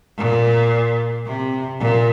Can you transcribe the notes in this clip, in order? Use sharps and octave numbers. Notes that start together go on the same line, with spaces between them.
A#2
C3
A#2